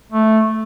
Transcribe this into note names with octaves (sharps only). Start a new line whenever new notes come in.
A3